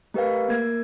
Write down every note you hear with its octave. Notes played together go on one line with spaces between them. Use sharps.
A3 G4 A#4 B4 F5
A#3 A#4 G#6